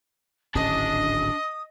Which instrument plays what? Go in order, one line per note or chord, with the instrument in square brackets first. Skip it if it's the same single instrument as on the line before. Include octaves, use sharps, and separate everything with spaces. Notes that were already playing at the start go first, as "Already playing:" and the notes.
[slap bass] D1 G#1 C#4 [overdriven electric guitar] D4 A5 [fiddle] D#5 [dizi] D#6